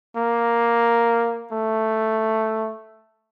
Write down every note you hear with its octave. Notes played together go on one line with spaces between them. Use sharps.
A#3
A3